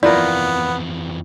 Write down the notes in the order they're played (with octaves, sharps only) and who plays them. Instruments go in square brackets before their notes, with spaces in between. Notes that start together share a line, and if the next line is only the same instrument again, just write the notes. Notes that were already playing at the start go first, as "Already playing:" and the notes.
[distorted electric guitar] F2 E3 [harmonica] B3 [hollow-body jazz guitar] E4 F4 A#4 [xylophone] D5